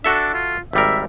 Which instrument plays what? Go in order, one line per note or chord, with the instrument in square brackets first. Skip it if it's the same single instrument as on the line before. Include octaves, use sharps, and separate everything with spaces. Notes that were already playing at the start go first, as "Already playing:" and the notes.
[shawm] D4 [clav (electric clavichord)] F#4 A4 E5
[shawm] F4
[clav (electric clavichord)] G#1 G3 A#4 [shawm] E5